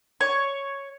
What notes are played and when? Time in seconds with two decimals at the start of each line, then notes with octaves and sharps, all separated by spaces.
0.21 C#5